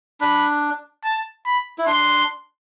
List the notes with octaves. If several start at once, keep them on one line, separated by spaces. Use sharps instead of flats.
D4 B5
A5
B5
E4
D4 C6